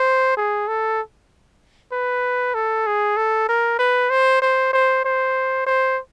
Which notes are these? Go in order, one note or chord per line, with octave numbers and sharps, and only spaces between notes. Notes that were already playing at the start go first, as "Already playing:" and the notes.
Already playing: C5
G#4
A4
B4
A4
G#4
A4
A#4
B4
C5
C5
C5
C5
C5